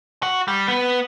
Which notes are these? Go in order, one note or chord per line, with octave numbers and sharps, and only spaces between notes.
F#4
G3
B3